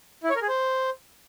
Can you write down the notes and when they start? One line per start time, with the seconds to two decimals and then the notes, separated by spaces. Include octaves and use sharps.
0.23 E4
0.30 C#5
0.36 A#4
0.42 G#4
0.48 C5